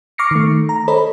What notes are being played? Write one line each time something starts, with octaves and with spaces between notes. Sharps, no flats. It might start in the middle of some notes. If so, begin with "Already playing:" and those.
C#6 D6 F6 A#6 C7 C#7
D#3 A3
A#5
A4 C5 C#5 D#5 B5